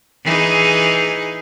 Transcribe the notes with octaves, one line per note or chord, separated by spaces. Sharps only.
E3 D#4 G#4